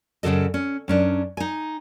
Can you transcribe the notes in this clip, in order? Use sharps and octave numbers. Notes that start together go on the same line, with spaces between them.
F#2 C#3 F3 A4 D#5
C#4
F#2 C#4 D4
D#4 G#5